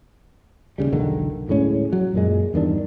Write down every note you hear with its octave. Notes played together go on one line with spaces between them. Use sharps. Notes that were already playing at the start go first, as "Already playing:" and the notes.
D#2 A2 C#3 G3
E1 B1 D3 D#3
D1 A2 G#3 C#4
F#3
F#2 A#2 G#3
E2 G2 D#3 D4